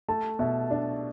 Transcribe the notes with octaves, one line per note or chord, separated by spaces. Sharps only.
A3 A5
B2 E5
D4 D5